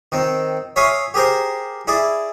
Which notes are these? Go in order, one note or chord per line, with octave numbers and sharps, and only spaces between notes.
D#3 C4
C#5 E5 F5 G#5 C6 D#6
G4 G#4 A#4 C5
E4 G#4 D5